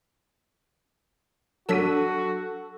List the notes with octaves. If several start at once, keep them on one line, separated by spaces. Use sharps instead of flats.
F#3 D4 F#4 A4 E6 B6 D#7